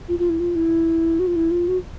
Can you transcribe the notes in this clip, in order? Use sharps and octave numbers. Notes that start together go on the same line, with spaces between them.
F4
F4
E4
F4
E4
F#4
F4
E4
F4
F#4